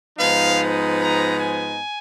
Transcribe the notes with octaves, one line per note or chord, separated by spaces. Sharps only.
G#2 F3 B3 D#4 F5
A#5
G#5